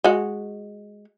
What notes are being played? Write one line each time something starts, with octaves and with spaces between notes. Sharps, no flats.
G#3 F#4